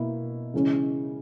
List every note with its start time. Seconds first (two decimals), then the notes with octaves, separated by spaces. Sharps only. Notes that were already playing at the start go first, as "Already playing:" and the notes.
Already playing: B2 A#3 E4
0.54 C#3 E3 G#3 C#4